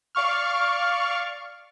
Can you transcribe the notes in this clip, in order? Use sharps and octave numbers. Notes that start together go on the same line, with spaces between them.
D5 F5 C#6 F6